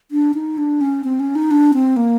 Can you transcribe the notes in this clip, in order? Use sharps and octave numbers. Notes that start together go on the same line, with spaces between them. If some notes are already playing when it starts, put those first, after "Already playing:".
D4
D#4
D4
C#4
C4
C#4
D#4
D4
C4
A#3